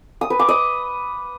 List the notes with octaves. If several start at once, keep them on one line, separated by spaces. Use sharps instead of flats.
D#6
B4
D6
D#5